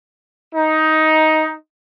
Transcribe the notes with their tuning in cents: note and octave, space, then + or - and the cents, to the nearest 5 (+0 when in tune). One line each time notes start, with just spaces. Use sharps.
D#4 +10